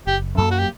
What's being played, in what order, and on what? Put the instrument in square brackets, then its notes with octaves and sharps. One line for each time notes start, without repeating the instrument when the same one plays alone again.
[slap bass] F#1 [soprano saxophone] G4
[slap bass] F#2 F#3 A#3 [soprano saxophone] A4
[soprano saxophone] F#4
G4